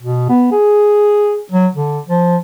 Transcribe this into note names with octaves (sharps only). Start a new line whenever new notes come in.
B2
B3
G#4
F#3
D3
F3